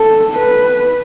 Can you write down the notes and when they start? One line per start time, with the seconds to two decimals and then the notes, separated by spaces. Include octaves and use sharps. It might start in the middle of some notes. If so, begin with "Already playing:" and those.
Already playing: A4
0.38 B4